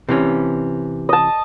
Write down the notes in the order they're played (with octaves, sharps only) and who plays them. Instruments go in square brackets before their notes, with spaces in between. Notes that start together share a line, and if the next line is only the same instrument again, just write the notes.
[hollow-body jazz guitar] C3 E3 C#4
[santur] D#5 A5